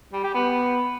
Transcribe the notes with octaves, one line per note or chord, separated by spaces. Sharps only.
G3
G4
B3